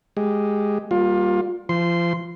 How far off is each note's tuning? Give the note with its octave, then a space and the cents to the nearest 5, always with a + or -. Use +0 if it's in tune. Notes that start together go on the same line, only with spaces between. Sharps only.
G#3 +0 G4 +0
G3 +0 A#3 +0 F4 +25
F3 -30 C6 -10